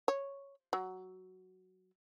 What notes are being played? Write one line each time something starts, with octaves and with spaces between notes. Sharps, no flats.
C#5
F#3